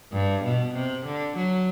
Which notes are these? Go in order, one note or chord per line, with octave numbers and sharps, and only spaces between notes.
G2
B2
C3
D3
F#3